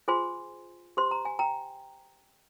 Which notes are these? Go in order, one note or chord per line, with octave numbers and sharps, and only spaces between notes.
F4 G#4 C5 G#5 C6
G4 C5 C6
A#5
G#5
G5 A#5